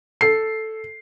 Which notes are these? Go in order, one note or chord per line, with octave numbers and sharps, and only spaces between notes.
A4 C7